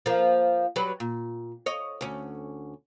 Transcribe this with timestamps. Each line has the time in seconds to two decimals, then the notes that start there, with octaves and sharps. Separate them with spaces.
0.06 F3 A#3
0.76 F#3 G3 B4
1.00 A#2
1.66 C#5 D#5
2.01 D2 C#4